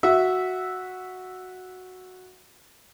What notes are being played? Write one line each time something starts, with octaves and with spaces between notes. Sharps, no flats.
F#4 E5